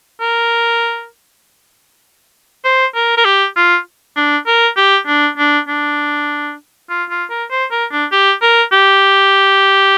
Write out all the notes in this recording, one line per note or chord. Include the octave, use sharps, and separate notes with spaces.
A#4
C5
A#4
A#4
G4
F4
D4
A#4
G4
D4
D4
D4
F4
F4
A#4
C5
A#4
D4
G4
A#4
G4